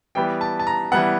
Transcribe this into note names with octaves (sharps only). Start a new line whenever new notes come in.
E3 G3 B3 G5
A5
A5
A#5
E3 G3 B3 F#5